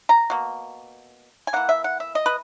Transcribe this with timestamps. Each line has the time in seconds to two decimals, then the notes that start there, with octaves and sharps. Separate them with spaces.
0.09 A#5
0.30 B2 A#3
1.47 G#5
1.53 E3 A#3 F#5
1.69 E5
1.84 F#5
2.00 E5
2.15 D#5
2.26 B4